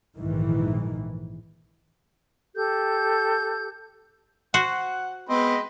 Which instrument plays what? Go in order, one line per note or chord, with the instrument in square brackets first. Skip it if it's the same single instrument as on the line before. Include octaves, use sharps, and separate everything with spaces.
[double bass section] A#1 G#2 D#3 E3
[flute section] G4 A4 G6
[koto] F#4 C5 [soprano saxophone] F#5
[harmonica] G#3 C4 B4 [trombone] B3 [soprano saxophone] D#5